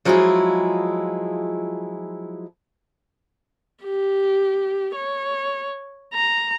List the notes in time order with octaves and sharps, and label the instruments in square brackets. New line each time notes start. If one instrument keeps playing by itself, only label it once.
[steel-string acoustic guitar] F3 F#3 G#3 E4 F4 G#4
[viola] G4
C#5
A#5